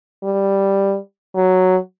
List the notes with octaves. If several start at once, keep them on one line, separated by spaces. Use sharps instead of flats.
G3
F#3